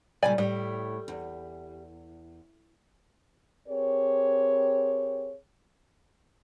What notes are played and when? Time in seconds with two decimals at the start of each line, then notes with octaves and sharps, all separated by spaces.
0.23 A#2 C#3 G3 D5 G#5 B5
0.38 A2 G3
1.08 E2
3.67 C4 G4 G#4 A#4 C#5